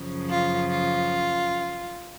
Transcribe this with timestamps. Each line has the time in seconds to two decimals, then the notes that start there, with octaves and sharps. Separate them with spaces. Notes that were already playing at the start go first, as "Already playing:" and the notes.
Already playing: F#2 C#3 F3
0.29 F4
0.70 F4